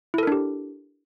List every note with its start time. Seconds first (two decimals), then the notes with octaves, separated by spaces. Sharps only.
0.14 E4
0.18 A4
0.23 A#4
0.27 D4
0.32 G4